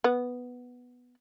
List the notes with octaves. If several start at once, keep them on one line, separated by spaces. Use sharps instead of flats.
B3